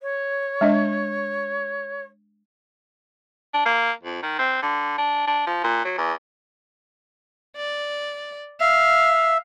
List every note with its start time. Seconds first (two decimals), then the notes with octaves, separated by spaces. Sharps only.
0.01 C#5
0.61 G#3 D4 D#5
3.54 D4
3.65 A#3
4.03 F2
4.23 D#3
4.39 C4
4.63 D3
4.98 D4
5.27 D4
5.47 F3
5.64 A#2
5.85 F#3
5.98 E2
7.56 D5
8.60 E5 F5